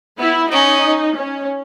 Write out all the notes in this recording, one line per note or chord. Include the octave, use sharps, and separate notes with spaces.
B3 E4
C#4 D#4
C#4